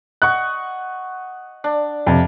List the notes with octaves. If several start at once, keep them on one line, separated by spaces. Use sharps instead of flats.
D#5 F#5 C#6 F#6
D4
F2 C3